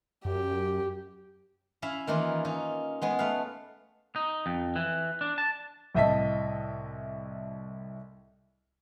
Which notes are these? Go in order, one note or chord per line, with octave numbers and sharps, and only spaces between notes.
F#2 G4
C#4 E4 E5 F5
D#3 E3 A#3 C#4 E4 F4
C#4 D#4
G#3 B3 G#4
A3 B4 F5
D#4
F2
E3
D4
A5
C2 A2 D#5 E5 A5 B6